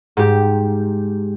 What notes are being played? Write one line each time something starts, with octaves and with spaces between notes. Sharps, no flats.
G#2 G4